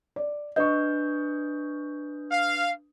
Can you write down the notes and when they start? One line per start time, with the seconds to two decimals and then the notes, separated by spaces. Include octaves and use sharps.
0.16 D5
0.56 D4 B4 D#5 C#6 G6
2.31 F5